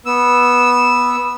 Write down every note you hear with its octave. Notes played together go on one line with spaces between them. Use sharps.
B3 E6